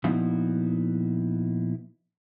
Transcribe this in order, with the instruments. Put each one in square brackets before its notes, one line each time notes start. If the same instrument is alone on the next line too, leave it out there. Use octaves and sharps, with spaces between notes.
[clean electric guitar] A#2 F3 B3 D#4 E4 F#4